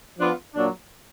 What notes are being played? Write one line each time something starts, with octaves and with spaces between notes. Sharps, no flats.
F3 B3 D4 F4
A#2 F#3 D4